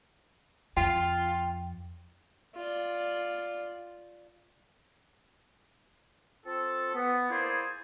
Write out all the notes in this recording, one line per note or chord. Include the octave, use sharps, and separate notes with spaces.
F2 F4 G5
F4 D5
C4 F4 A4
B3
A#3 E4 G#4 C5 D5